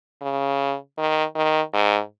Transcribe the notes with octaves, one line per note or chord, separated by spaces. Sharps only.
C#3
D#3
D#3
G#2